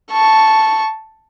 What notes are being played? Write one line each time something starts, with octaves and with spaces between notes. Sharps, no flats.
A5 C#6